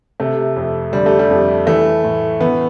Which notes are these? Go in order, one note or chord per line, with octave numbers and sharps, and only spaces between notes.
C3 A3
F2
D3 G3
A3
G3
F2
E3 A3
A2
E3 B3